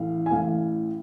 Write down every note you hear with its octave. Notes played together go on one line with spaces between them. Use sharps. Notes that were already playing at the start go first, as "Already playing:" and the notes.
Already playing: A1 A2 E3 F5
G#5
A1 A2 E3 F5